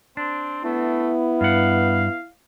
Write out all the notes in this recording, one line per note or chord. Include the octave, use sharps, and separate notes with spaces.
C4 D4
A3 B3 E4
G2 F5 F#5